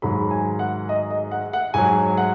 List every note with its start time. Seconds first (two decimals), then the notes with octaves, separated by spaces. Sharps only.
0.02 G#2 D#3 F#3 B5
0.31 G#5
0.59 F#5
0.89 D#5
1.10 D#5
1.31 F#5
1.53 F#5
1.74 G#2 F#3 G#5
2.17 F#5